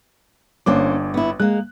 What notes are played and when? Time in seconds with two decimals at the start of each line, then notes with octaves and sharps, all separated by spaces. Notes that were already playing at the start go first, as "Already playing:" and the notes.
0.66 G1 A#3 C#4 D4 C5 D6
1.14 B3 E4
1.40 G#3 A#3 F#6